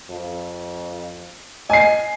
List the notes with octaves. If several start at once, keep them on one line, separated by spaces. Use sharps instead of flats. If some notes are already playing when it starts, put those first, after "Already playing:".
F2
D#5 G#5 C7